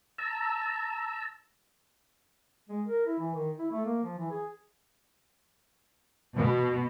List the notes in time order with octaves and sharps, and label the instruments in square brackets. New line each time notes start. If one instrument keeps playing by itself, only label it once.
[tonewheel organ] A5 A#5 E6
[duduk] G#3
A#4
E4
E3
D#3
E4
A3
A#3
F3
E3
G#4
[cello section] B2